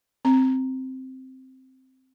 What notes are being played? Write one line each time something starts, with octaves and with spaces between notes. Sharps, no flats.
C4 A#5